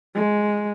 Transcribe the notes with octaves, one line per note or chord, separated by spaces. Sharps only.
G#3